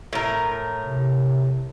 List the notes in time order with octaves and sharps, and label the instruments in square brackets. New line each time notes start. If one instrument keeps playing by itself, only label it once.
[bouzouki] A2 A#4
[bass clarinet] C3